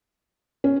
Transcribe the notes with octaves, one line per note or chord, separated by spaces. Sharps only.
C#4